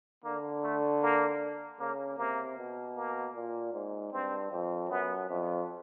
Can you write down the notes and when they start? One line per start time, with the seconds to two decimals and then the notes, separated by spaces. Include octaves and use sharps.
0.24 D3 A#3
0.63 A3
1.02 A#3
1.80 C#3 A#3
2.18 C3 A#3
2.58 B2
2.96 A#3
3.35 A#2
3.74 G#2
4.13 G2 C4
4.51 F2
4.89 F#2 B3
5.29 F2